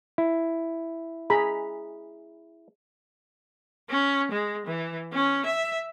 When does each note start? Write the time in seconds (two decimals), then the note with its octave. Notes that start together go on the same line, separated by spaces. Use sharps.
0.18 E4
1.30 G#4 A#5 B5
3.90 C#4
4.32 G#3
4.67 E3
5.13 C#4
5.46 E5